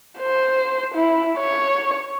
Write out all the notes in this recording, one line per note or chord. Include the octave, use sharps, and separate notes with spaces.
C5
E4
C#5